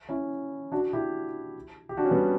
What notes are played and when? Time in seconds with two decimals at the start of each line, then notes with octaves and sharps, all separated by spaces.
0.09 C#4 E4
0.72 D4 F#4
0.93 E4 G4
1.89 G4
1.97 D4 F#4
2.05 C#4
2.11 G3 B3